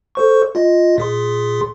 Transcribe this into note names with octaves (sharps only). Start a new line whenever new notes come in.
A4 C5 C#6
F4 D#5
A#2 G#4 C6